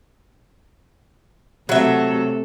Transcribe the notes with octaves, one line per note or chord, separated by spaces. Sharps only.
C3 F#3 A3 A4 E5